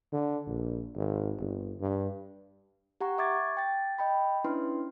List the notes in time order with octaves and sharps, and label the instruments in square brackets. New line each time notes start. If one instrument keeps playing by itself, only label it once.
[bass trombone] D3
A#1
G#1
G1
G2
[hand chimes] G4 F#5 A#5 C#6
E5 C#6 D6 G#6 A6
G5 A6
D#5 G5 B5
C#4 D4 E4 B4 C6